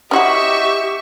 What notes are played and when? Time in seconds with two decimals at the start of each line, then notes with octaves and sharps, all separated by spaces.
0.11 C#4 E4 F#4 G4 D#5 E5 C#6